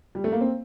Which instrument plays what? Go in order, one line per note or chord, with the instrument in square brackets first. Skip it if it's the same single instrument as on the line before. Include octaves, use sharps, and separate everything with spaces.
[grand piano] G3
A3
A#3
C4